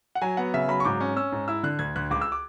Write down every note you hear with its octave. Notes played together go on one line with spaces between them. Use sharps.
F#5
F#3 G#5
B3 F#5
C#3 E5
F#3 B5
C#6
G#2 D6
C#4
C#4 E6
G#2
E4 E6
D3 F#6
D2 G#6
D2 F#6
C#2 D6
E6
D6